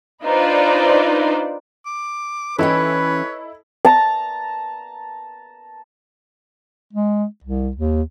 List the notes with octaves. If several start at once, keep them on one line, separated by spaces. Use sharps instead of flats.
D4 D#4 F4 B4 C5 D5
D6
E3 C#4 D#4 E4 A4 B4 C#5 G5
A5 A#5
G#3
C2
D#2